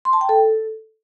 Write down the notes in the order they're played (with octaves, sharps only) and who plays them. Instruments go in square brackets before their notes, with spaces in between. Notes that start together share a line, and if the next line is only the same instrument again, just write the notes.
[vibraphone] C6
A5
G5
A4